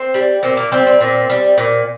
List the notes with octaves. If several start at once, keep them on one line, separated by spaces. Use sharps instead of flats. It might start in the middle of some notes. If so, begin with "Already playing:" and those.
Already playing: C4
G3
A#2 C4
A#3
G3 C4
C4
A#2
G3
A#2